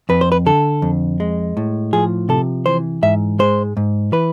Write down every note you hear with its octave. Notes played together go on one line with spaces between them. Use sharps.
F2 B4
C5
B4
D3 A4
F2
G#3
A2
F3 G#4
C3 A4
E3 C5
G#2 E5
G#3 C5
G#2
E3 B4